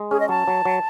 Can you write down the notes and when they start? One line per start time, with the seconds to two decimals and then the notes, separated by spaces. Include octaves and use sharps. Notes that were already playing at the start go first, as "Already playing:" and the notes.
Already playing: G#3
0.11 C#4 G#4
0.20 D#5
0.29 F#3 A5
0.48 F#3
0.65 F#3